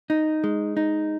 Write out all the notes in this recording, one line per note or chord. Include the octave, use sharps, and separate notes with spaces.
D#4
G#3
D#4